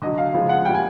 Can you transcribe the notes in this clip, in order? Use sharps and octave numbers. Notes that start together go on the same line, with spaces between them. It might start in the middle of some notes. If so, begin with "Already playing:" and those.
D3 F#3 D#5
F5
C#3 F3 G#3
F#5
A#2 G3 G5
G#5